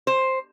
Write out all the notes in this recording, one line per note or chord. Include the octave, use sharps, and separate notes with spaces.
C5